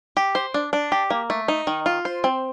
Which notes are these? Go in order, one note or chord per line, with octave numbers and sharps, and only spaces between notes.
G4
C5
D4
D4
G4
A#3
A3
D#4
D#3
F4
C5
C4